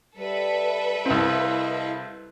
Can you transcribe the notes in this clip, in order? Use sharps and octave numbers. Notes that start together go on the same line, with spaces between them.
G3 A4 B4 E5
C2 C4 E4 D#5 F5